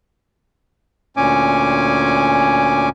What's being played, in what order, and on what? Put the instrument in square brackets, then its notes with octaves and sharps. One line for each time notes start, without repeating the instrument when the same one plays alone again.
[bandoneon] D2 A#2 C#4 G#5 D6